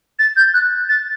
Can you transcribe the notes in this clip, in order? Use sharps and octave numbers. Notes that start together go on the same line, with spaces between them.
A6
G6
F#6
A6